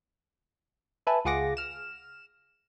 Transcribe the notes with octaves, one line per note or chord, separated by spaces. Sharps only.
A4 B4 E5 G#5 A5
C#2 F4 G#4 F#5 D6 A#6
F6 E7